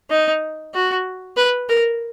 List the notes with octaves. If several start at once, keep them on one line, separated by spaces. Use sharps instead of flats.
D#4
F#4
B4
A#4